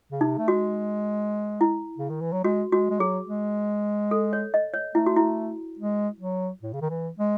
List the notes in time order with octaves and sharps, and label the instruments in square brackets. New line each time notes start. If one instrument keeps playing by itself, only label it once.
[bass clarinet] C#3
[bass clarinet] C3 [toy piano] D#4
[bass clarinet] A3
[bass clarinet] G#3 [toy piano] F#4
[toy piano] E4
[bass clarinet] C#3
D#3
E3
F#3
[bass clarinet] G#3 [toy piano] F#4
[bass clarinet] G#3 [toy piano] F#4
[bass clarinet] G#3
[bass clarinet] F#3 [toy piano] G#4
[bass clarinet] G#3
[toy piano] A4
C#5
D#5
C#5
[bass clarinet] A3 [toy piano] E4
[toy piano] F#4
E4
[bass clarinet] G#3
F#3
A2
C#3
D#3
E3
G#3